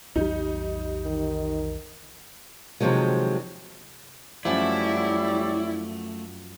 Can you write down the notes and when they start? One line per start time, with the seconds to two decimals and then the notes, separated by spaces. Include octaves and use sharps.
0.16 B1 F2 E3 G3 D#4
1.05 D#3
2.81 C3 D#3 F3 F#3 G#3
4.45 F#2 F3 G3 A3 E4 C#5 D5